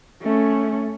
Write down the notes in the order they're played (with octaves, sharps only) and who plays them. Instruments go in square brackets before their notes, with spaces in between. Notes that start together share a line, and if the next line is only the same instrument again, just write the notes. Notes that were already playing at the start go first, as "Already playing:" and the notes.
[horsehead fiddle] A3 C#4